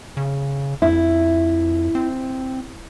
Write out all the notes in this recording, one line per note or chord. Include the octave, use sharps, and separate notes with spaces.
C#3
F2 E4
C4